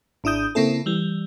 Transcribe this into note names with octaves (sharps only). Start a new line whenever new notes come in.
G#1 D4 E4 D#6 G6
C#3 A#3 C4 E4 A4
E3 G3